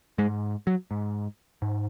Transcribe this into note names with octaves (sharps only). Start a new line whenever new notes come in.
G#2 G#3
F#3
G#2
G#2